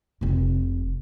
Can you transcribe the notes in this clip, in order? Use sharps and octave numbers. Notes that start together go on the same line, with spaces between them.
F1 C3